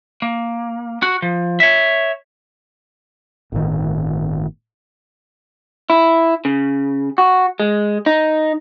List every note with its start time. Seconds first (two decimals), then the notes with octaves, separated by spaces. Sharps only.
0.22 A#3
1.03 F#4
1.22 F3
1.60 C#5 E5
3.52 G1 A2 C3 D#3
5.90 E4
6.45 C#3
7.18 F#4
7.60 G#3
8.06 D#4